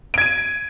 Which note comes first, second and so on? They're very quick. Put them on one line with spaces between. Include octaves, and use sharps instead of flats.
D7 G#6 D#7